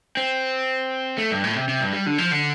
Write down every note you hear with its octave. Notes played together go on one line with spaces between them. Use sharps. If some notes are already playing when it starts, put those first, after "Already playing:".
C4
A3
G2
A2
C3
C3
G2
G3
D3
F3
D3